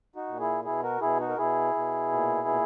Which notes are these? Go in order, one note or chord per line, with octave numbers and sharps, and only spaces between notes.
D#4 F#4
A#2
E4 G#4
B2 E4 G#4
F#4 A#4
B2 E4 G#4
D#4 F#4
A#4
B2 E4 G#4
B2
A#2
A#2